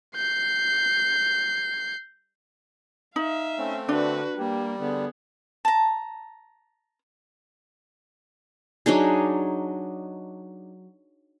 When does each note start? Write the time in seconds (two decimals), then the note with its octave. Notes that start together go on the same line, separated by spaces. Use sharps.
0.16 G6 C7
3.16 D#4 E5 F5
3.58 A3 C4 C#4
3.89 D3 D4 F#4 B4
4.38 G3 A#3 G4
4.81 D3 B3 G#4
5.65 A5 A#5
8.86 F#3 D4 D#4 G#4